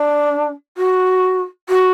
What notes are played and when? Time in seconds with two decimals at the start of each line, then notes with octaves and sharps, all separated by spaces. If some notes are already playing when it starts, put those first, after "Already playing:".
Already playing: D4
0.77 F#4
1.69 F#4